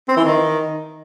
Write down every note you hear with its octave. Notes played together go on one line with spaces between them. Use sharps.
C4
E3
D#3